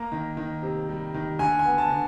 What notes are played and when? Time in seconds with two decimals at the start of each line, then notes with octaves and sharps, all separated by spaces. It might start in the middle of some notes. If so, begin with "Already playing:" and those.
Already playing: A#3 A#5
0.12 D#3
0.37 D#3
0.62 C3
0.89 G3
1.14 D#3
1.39 D3 G#5
1.59 G#5
1.66 B3
1.78 A5
1.90 D3